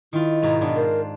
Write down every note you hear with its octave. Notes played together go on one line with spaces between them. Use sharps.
D#3 E4 F4
G#2 B2 A#5
B2 B3 D4
A#4 C5